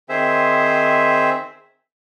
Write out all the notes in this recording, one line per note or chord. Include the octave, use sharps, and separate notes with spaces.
D#3 C4 G#4 C5 E5